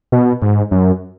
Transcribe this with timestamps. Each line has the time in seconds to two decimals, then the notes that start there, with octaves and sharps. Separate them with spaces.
0.12 B2
0.42 G#2
0.71 F#2